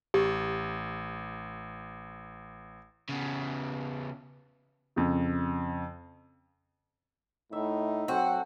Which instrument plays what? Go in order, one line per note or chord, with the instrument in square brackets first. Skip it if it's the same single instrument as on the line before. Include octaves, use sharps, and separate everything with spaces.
[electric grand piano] A1 [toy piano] G4
[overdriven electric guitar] C#3 B3
[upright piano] F2 C#3
[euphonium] A2 [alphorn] D#4 [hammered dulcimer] E5
[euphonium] F#3 [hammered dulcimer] C4 A4 [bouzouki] F#4